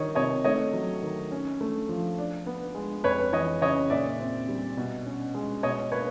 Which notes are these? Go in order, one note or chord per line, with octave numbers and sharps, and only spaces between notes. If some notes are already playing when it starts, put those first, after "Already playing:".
Already playing: D#3 G3 C#5 D#5
C3 C#5 D#5
A3 C#5 D#5
F#3
D#3
C#4
A3
F3
D4
B3
G#3
F2 B4 C#5
E3 C#5 D#5
C#3 C#5 D#5
A#2 D5 E5
C4
G3
B2
C#4
G#3
B2 C#5 D#5
A#3 B4 C#5